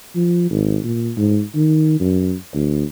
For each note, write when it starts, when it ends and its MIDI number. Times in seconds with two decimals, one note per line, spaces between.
0.15 0.48 53
0.50 0.78 32
0.84 1.11 46
1.17 1.42 44
1.55 1.95 51
2.00 2.35 42
2.54 2.84 38